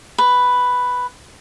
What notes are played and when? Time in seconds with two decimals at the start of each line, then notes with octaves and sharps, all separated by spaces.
0.18 B4